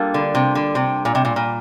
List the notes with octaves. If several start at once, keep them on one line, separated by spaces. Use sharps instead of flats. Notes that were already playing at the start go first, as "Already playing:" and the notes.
Already playing: G3 A#3 D4 F4 A4
D3
C3
D3
C3
A#2
C3
A#2
A#2